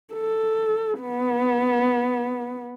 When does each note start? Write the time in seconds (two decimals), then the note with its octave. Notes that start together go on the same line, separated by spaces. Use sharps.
0.14 A4
1.01 B3